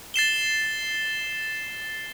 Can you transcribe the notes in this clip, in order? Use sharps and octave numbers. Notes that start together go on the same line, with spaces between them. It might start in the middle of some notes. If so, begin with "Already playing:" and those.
A6 C7 E7 G7